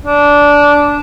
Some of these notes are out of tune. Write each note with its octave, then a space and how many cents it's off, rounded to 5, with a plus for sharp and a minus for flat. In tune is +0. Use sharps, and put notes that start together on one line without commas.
D4 -15